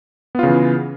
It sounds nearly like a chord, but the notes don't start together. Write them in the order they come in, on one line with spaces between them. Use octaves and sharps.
B3 F4 C#3 E3